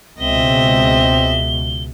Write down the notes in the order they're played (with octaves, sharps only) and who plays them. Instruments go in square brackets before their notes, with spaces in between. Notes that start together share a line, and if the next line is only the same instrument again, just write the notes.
[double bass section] C#2 B2 [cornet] C4 [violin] D#5 E5 [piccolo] G7